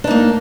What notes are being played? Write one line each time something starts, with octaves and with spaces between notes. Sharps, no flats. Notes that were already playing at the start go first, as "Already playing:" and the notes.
A#3 D4 D#4